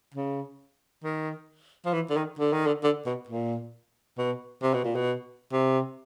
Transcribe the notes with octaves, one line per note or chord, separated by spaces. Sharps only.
C#3
D#3
F3
E3
D3
D#3
D3
D#3
D3
D3
B2
A#2
B2
C3
B2
A#2
B2
C3